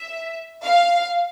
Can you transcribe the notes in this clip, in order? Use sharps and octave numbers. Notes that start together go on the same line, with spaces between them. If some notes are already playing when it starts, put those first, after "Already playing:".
Already playing: E5
F5